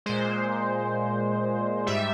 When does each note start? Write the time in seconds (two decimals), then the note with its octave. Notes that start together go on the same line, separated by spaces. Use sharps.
0.06 A#2 G#3 C5
1.86 G#2 G3 E5